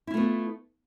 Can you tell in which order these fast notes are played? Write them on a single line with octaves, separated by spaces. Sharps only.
E4 F4 A3 B3